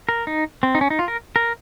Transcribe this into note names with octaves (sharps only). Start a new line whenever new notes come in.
A#4
D#4
C4
D#4
C#4
D#4
F4
A#4
A#4